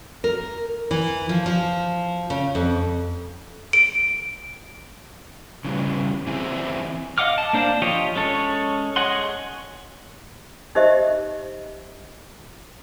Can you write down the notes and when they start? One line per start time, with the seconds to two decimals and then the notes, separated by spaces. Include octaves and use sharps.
0.24 A#4
0.91 E3
1.29 F3
1.46 F3
2.30 C#3
2.55 F2
3.73 D7
5.65 C#3 E3 G3
6.27 E3 C4 E4 G#4
7.18 D#5 F5 F#5 D6 F6
7.38 A5
7.53 A#3 D4 C5 F5 A5
7.82 F3 F4 G4 C#5 D#5
8.16 G#3 C#4 A4 C#5
8.96 G#4 C#5 D#5 F#5 C6
10.75 D#4 G4 C5 D#5 E5